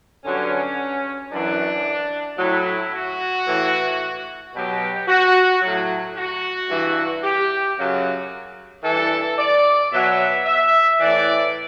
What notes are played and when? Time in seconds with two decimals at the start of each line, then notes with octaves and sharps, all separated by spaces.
0.24 G2 D3 F#3 C#4
1.31 F#2 E3 D4
2.39 A2 F#3 E4
2.93 F#4
3.46 A2 E3
4.54 B2 F#3 G4
5.08 F#4
5.62 A2 F#3
6.16 F#4
6.70 G2 E3
7.23 G4
7.76 F#2 C#3 F#3 F#4
8.84 G2 E3 A4
9.38 D5
9.91 B2 F#3 E5
10.46 E5
10.99 A2 E3 D5